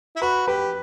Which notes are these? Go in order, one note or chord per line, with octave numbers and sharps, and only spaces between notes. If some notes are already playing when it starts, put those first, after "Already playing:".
E4
F#4 B4 B5
G4 B4 B5